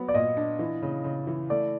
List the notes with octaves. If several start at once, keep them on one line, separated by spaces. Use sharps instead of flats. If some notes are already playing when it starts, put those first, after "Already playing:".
Already playing: F#3 B3
D5
A#2 D#5
D4
E3
C#3
C#3
E3
A3 D5